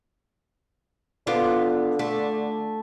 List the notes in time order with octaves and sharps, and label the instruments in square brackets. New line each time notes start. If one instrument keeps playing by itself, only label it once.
[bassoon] D3 [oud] B3 D4 F4
[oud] A3